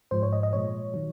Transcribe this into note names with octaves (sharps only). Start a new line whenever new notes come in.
G#2 F3 G#3 C5
C#5
D#5
D#5
A#2 F3 G#3 C#5
D#3 F#3